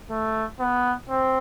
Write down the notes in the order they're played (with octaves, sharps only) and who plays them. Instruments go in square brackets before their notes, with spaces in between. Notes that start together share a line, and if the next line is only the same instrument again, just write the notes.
[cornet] A3
B3
C4